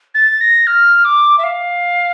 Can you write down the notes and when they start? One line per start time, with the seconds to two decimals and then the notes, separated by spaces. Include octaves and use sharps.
0.14 A6
0.40 A#6
0.66 F6
1.04 D6
1.38 E5
1.43 F5